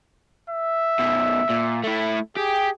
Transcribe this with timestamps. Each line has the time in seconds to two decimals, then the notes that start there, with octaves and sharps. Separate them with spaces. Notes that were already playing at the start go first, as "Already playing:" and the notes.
0.50 E5
0.99 F#2 B2
1.50 A#2
1.84 A3 E4
2.37 G4 G#4